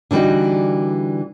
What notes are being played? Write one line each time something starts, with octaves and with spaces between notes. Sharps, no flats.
D3 E3 G3 D#4 F#4